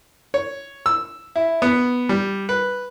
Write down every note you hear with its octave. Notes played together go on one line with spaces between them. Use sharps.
C#5
E6
E4
B3
G3
B4